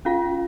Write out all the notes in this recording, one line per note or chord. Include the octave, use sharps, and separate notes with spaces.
C#4 F4 F5